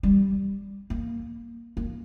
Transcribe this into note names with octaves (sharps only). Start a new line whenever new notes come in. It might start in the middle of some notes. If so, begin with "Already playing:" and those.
G3
A#3
A#3